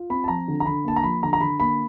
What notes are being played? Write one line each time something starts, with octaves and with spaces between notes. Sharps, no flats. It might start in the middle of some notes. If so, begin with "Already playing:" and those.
Already playing: F4
C4 B5
A5
F3 A#5
D3
A#5
D3 B5
A#3 A5
A#5
F3 B5
D3 A#5
A#5
D3 B5
A#3 B5